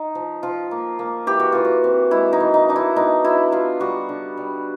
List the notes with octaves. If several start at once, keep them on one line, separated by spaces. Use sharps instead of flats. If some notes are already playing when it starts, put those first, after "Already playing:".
Already playing: D#4
F3
F3 F4
A#3
A#3
E3 G4
F#4
E3 F4
F#4
C4
G#3 E4
D#4
E3
D#4
D4 D#4
E4
B3 D#4
F#3 E4
B3 F4
G3 F#4
D3
G3